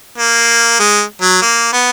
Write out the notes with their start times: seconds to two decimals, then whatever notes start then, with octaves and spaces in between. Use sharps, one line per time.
0.18 A#3
0.80 G#3
1.22 F#3
1.42 A#3
1.73 B3